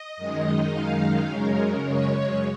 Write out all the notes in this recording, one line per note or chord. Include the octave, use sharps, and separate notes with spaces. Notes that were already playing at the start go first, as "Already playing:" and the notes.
Already playing: D#5
F#2 D#3 G#3 D#4
F5
F#2 C#3 G#3 C#4 A#4
C#5